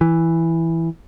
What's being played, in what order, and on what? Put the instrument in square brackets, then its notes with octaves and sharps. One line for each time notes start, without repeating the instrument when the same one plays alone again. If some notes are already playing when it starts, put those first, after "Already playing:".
[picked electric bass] E3